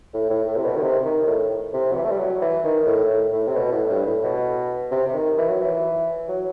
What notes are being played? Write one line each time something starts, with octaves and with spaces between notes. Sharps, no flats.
A2
A2
A2
C3
B2
D#3
C3
D#3
A2
C3
F#3
E3
A3
G3
F#3
E3
D#3
A2
A2
A2
C3
B2
A2
G2
A2
B2
C3
C3
D#3
E3
F#3
E3
F#3